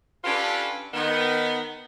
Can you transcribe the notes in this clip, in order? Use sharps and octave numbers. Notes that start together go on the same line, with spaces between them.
C#4 D4 F4 G4 A4 B4
D#3 B3